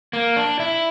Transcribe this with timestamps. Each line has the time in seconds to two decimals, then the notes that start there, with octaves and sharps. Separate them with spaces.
0.13 A#3
0.36 D4
0.60 E4